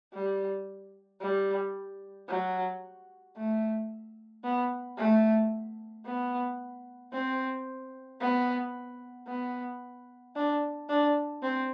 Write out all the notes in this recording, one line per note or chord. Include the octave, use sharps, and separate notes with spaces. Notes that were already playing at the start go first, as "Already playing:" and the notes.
G3
G3
F#3
A3
B3
A3
B3
C4
B3
B3
D4
D4
C4